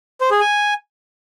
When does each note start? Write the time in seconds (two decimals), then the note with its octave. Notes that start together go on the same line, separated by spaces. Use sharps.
0.21 C5
0.31 G#4
0.41 G#5